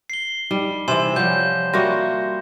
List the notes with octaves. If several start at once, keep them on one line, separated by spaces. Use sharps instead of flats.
C7 G7
G3 D#4
C3 E3 G#5 C6 E7
F3 G3 C#5 F#5 G6
G3 A#3 F#4 E5 C6 A#6